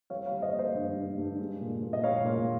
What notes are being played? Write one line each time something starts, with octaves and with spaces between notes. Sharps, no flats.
G3 C#5 F5
C#5 F5
G3
C5 D#5
A#3
C5 D#5
G2
G2
G2
G#3
A#2
A#2
D#5
G#3 C#5 F5
A#2